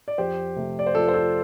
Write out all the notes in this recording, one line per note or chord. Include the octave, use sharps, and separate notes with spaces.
D5
F2 G4 C5
C3 A3
D5
C5
F2 F4 A4
C5
F4 A4